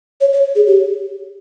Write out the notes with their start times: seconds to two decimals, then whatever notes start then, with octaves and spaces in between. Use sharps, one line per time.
0.21 C#5
0.33 C#5
0.55 G#4
0.67 G4